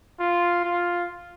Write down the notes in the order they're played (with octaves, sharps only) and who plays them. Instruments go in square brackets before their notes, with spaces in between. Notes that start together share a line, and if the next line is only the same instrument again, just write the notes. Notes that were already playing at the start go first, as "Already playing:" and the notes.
[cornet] F4
F4